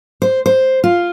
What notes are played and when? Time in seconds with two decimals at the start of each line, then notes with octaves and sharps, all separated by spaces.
0.22 C5
0.46 C5
0.84 F4